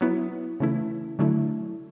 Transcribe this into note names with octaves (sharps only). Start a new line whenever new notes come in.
F#3 B3 E4
C#3 E3 A3 E4
D3 F#3 A3 E4